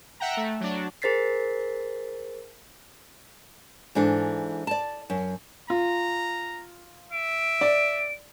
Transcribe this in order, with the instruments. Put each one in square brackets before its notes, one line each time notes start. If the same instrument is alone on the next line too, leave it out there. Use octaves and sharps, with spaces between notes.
[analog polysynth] E5 F#5 G5 A#5
A3
F#3 D4
[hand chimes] G#4 A#4 C5 A6 B6 C7
[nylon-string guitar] G#2 E3 D4 A4
D5 A5
F#2
[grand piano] F4 [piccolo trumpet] A#5
[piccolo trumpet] E5 [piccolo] D7
[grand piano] D5